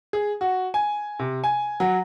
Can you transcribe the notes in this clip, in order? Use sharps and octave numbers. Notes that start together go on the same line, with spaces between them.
G#4
F#4
G#5
C3
G#5
F#3